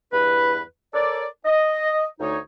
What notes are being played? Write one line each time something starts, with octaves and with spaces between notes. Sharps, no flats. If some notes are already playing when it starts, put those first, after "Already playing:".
E2 G2 E4 B4
A4 A#4 C#5 D5
D#5
D2 D#4 C#5